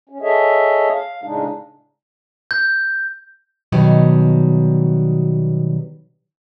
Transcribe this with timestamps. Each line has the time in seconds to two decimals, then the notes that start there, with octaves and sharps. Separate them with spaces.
0.09 C#4
0.22 G#4 A4 C#5 D#5 E5
0.93 F5
1.24 A2 C#3 G#3 D4 D#4
2.51 G6
3.72 B2 D#3 F#3 G3